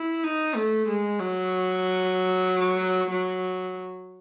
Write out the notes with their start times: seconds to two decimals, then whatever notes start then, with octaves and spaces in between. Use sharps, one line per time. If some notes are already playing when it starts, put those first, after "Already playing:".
Already playing: E4
0.24 D#4
0.56 A3
0.88 G#3
1.19 F#3
3.11 F#3